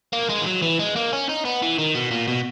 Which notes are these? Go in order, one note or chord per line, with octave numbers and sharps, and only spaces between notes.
A#3
G#3
E3
F#3
E3
G#3
A#3
C#4
D#4
B3
E3
D#3
B2
A#2
B2